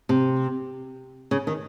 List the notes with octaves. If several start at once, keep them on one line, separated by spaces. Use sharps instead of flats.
C3
C#3
D#3